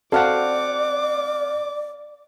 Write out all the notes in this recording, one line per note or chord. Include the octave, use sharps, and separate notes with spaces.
C4 F#4 A4 D5 F5 F#5 D6